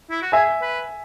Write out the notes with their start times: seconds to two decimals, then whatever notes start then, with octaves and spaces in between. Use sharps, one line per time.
0.10 E4
0.22 F#4
0.32 G#4 E5 G#5
0.62 B4